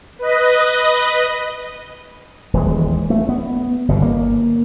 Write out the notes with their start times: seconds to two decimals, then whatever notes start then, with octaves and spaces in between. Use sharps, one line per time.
0.19 B4 D#5
2.53 D#1 E3 G#3
3.10 A3
3.29 B3
3.88 G1 B2
4.02 A#3